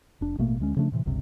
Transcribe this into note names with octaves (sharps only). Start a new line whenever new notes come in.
F1 D4
A1 B2 A3 A#3
D2 G#3 C#4
C#3 F3 A3 D4
A2 C3 E3
G1 C#2 G2 C3